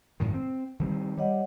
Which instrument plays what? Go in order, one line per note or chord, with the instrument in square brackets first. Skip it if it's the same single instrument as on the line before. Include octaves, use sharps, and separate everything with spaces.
[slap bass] F#2 A2 D#3
C4
D#3 G3 C4
[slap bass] G3 [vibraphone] C#5 D#5 F#5